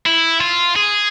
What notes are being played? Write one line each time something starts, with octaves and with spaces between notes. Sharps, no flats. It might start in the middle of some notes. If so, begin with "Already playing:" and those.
E4
F4
G#4